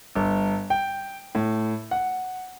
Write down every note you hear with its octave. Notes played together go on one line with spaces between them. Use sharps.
G1
G5
A2
F#5